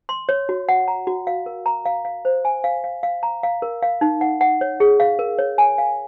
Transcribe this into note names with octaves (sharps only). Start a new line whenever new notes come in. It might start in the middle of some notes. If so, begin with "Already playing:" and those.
C6
C#5
F#4
F#5
A#5
F#4
F5
A#4
A#5
F5
F5
C5
G#5
F5
F5
F5
A#5
F5
A#4
F5
D#4
F#5
F#5
C#5
G#4
F5
A#4
C#5
G#5
F5